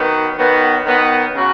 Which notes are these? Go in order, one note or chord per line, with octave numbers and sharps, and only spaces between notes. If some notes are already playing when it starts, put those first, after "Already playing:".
Already playing: D#3 F#3 B3
D#3 F#3 B3
D#3 F#3 B3
C#3 F#3 C#4 F#4